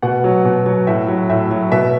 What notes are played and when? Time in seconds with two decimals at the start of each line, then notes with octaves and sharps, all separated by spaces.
0.02 B2 F#5
0.24 F#3
0.45 B2
0.66 F#3
0.87 A2 E5
1.08 F#3
1.30 A2 E5
1.51 F#3
1.72 B2 E5